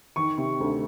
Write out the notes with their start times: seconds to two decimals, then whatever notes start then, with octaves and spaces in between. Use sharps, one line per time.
0.16 D#3 C#6
0.38 C3
0.60 D2